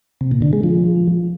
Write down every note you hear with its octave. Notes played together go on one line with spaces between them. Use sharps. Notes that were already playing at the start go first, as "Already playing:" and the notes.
C3
A#2
D3
G#3
F3